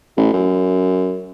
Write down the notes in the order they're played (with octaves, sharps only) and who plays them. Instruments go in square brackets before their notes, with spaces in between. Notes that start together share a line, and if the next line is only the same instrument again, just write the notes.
[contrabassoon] A1
F#2